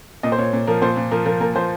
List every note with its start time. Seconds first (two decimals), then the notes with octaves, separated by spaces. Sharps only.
0.23 A#2 D#5
0.32 C5
0.38 A#2 C#5
0.53 A#2
0.67 F3 A#4
0.82 A#2 C5
0.97 A#2
1.11 F3 A#4
1.25 F3 A#4
1.41 A#2 A#4
1.55 F3 C5